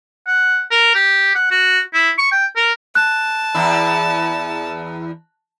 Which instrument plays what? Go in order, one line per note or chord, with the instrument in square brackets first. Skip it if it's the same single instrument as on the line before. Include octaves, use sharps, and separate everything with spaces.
[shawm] F#5
A#4
G4
F#5
F#4
E4
C#6
G5
A#4
[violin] A5 [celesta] F#6
[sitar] E2 E4